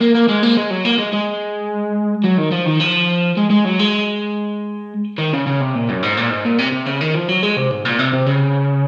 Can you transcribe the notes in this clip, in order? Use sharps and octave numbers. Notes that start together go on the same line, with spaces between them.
A#3
A#3
G#3
A#3
G#3
F#3
A#3
G#3
G#3
F#3
D#3
F3
D#3
F3
G#3
G#3
F#3
G#3
D#3
C#3
C#3
C3
A#2
F#2
G#2
A#2
G#2
A#2
C3
C3
C#3
D#3
F3
F#3
G#3
C3
G#2
A#2
C3
C3
C#3